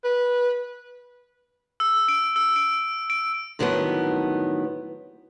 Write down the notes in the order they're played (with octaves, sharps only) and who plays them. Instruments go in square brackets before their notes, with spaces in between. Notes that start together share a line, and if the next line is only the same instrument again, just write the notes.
[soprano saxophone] B4
[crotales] E6
D7
E6
D7
D7
[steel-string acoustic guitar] A2 D3 D#3 F#3 G3 B3